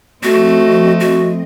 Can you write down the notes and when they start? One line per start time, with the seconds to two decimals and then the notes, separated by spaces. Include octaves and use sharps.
0.24 F3 A3 C4 F#4 D#5
1.00 F#4